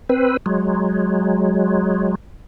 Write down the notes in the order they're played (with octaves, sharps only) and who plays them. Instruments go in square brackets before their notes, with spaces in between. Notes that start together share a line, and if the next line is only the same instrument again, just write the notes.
[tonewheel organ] C4 B4
F#3 G#3